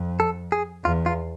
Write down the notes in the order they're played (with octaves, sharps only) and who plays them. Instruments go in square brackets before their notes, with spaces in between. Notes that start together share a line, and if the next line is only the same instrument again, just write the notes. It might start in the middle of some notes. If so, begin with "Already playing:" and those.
Already playing: [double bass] F2
[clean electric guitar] A4
G#4
[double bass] E2 [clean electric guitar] F4
[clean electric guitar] F4